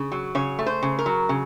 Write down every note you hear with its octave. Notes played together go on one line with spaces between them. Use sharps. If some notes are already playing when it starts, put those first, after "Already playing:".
Already playing: C#3
F#3
C#3 C#5
A3
C5
C#3
A#4
F#3
C#3